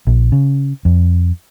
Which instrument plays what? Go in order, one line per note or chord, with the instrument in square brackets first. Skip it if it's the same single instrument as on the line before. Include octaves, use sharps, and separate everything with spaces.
[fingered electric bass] A#1
C#3
F2